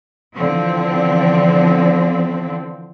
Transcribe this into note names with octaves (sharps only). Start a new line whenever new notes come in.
D3 E3 F3 C4